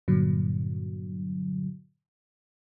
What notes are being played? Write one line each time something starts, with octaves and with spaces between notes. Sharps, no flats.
G2 A#2 D3 F#3